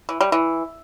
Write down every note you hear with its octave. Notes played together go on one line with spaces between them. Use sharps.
E3
G3
E3